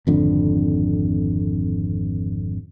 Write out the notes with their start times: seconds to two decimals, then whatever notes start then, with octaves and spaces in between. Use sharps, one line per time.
0.07 G#1 F2 D3